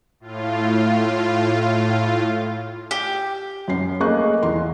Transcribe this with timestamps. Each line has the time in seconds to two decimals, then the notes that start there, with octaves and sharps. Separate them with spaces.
0.20 A2 F4
2.91 G4
3.68 F#2 C#4 C7
4.00 A3 A#3 G#4 D#5 C#6 F#6
4.43 E2 C6